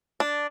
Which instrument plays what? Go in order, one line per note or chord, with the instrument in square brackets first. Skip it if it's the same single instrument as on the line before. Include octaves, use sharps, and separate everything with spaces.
[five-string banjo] D4